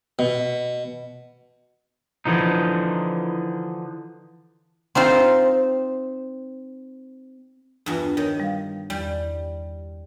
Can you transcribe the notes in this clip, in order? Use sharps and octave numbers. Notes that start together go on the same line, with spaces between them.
B2
D3 E3 F3 D#4
C4 D#4 F4 C5
E2 G2 D4 F4
D#3 A#4 C#5
G3 F5
E2 G3